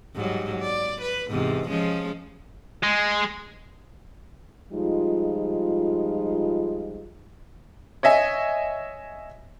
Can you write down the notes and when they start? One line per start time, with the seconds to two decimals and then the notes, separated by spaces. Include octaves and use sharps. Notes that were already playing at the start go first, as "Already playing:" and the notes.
0.15 G#2 F#3 G3
0.59 D5
1.01 B4
1.31 E2 G#2 C3
1.68 F3 G#3 C#4
2.83 G#3
4.72 F3 G3 G#3 D#4 F4
8.03 C#5 D#5 E5 G#5